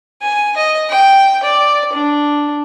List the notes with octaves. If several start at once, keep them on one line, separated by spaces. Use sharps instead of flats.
G#5
D#5
G5
D5
D4